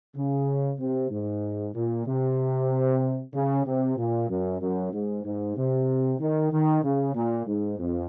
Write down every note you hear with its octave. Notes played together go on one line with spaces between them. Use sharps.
C#3
C3
G#2
A#2
C3
C#3
C3
A#2
F#2
F#2
G#2
G#2
C3
D#3
D#3
C#3
A#2
G#2
F2